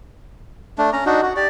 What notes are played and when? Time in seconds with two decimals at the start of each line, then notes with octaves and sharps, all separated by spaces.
0.78 A3 D4
0.93 C#4 A#5
1.06 D4 D#4 F#4
1.23 F#4
1.36 G4 D5